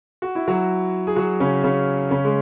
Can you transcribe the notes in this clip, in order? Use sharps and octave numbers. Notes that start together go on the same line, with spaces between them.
F#4
E4
F#3 F#4
G#4
F#3 F#4
C#3 C#4
C#3 C#4
C#3 C#4
G#3